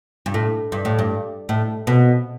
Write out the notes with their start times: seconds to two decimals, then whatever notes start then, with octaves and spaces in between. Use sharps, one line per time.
0.26 G2
0.34 A2
0.72 G2
0.85 A2
0.99 G2
1.49 A2
1.87 B2